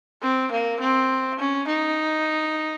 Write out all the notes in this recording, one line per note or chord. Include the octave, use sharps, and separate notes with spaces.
C4
A#3
C4
C#4
D#4